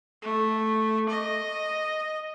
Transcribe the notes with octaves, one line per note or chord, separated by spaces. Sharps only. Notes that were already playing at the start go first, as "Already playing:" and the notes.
A3
D#5